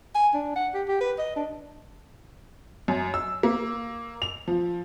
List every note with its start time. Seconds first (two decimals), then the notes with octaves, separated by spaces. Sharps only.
0.15 G#5
0.34 D4
0.56 F#5
0.74 G4
0.88 G4
1.01 B4
1.19 D#5
1.36 D4
2.88 F#2
3.14 E6
3.43 A#3
4.22 F7
4.47 F3